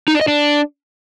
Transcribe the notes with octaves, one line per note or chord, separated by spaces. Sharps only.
D#4
D4
D#5
D4